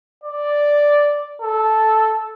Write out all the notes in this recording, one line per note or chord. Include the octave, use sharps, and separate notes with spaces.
D5
A4